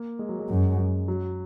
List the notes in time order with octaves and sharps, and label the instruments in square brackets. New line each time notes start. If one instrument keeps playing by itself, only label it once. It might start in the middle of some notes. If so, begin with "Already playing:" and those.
Already playing: [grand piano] A#3
G#3
F#3
G#3
[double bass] F#2
[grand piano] F#3